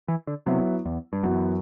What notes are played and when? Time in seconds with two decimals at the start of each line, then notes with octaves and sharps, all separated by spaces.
0.08 E3
0.27 D3
0.46 C3 F#3 B3 E4
0.85 E2
1.13 G2
1.23 F#2 E3 B3 F#4